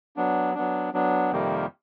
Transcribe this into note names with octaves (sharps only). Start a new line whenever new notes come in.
F#3 B3 D4
F#3 B3 D4
F#3 B3 D4
F2 C3 D#3 G3 A#3